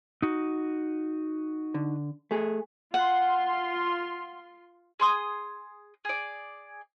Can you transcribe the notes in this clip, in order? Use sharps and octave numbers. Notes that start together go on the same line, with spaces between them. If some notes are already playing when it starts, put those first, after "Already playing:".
D#4 F#4
D3
A3 G#4
F4 F#5 C6
G#4 C6 D#6
G#4 D5